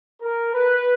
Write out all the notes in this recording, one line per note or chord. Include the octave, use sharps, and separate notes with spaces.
A#4
B4